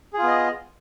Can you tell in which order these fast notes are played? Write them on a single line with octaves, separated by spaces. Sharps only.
G#4 F4 B3 D#5